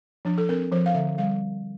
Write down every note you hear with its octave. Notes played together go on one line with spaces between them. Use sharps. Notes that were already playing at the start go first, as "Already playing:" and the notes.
F3 D4
A4
C4 A#4
F3 C5
F5
D3 E5
G3 F5